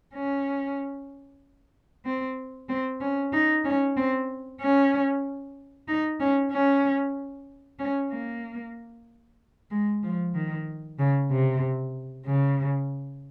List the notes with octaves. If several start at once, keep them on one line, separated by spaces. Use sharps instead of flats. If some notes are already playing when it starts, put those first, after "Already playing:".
C#4
C4
C4
C#4
D#4
C#4
C4
C#4
D#4
C#4
C#4
C#4
A#3
G#3
F3
D#3
C#3
C3
C#3